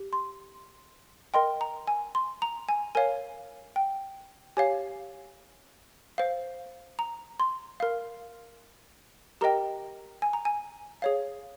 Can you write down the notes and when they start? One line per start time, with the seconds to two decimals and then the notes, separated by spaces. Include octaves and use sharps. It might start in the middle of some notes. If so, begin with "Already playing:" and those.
Already playing: G4
0.13 C6
1.34 A#4 D#5 G5 C6
1.61 A#5
1.87 G#5
2.15 C6
2.42 A#5
2.69 G#5
2.95 A#4 C#5 F5 G#5
3.76 G5
4.57 G4 C#5 F5 G#5
6.18 C5 F5
6.99 A#5
7.40 C6
7.80 A#4 F5
9.41 G4 A#4 D#5 G5 A#5
10.22 G#5
10.33 A#5
10.45 G#5
11.02 G#4 C#5 F5